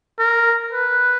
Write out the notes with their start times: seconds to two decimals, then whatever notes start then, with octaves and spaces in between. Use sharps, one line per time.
0.19 A#4
0.72 B4